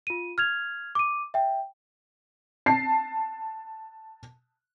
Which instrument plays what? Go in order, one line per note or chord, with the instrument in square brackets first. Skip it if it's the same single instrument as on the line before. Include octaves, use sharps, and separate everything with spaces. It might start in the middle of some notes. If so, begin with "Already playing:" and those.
[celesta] F4 D#7
F6 G#6 F7
D6 D#7
E5 G5
[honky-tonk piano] A5 C7